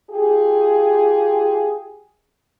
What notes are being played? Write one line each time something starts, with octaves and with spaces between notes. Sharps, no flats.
F4 G4 G#4